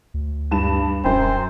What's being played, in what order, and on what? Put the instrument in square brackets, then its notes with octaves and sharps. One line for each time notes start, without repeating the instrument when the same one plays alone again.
[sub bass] D2
[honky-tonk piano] G2 A5 E7
[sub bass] D#1 [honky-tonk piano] F#2 [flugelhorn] C5 [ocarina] G5